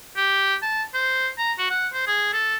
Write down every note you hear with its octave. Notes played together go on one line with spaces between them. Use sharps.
G4
A5
C5
A#5
F#4
F#5
C5
G#4
A4